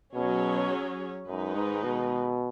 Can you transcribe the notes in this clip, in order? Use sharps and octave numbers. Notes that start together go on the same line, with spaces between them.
B2 F#3 C#4 G#4 C#5
F#2 D#3 G#3 D#4 B4
G#2
B2